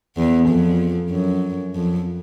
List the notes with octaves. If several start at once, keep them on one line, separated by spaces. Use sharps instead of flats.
E2
F2
F#2
F2